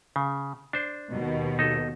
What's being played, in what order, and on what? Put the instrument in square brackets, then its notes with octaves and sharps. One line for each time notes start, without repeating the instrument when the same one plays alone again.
[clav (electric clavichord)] C#3
D4 C5
[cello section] D#2 B2
[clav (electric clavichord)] D#4 A4